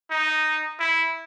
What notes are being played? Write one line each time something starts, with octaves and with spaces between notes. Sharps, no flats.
D#4
E4